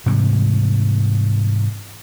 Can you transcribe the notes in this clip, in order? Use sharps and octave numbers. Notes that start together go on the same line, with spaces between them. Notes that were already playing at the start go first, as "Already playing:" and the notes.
G#2 C3 E3 G3